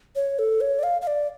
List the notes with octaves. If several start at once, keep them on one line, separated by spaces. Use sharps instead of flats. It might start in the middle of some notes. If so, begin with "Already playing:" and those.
C#5
A4
C#5
D5
F5
F5
D5